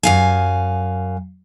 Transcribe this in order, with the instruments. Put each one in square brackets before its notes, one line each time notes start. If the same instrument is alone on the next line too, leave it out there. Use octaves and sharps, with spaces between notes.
[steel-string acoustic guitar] F#2 F5 G#5